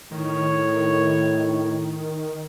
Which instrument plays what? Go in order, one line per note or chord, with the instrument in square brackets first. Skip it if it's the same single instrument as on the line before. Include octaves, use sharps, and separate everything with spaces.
[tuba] A2 [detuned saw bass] D#3 [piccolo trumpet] C#5